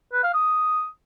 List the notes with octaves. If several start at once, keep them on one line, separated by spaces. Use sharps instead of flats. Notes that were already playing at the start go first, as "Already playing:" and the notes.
B4
F5
D#6